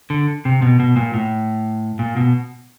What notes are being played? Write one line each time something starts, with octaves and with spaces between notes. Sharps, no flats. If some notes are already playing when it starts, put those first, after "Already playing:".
D3
C3
B2
B2
A#2
A2
A#2
B2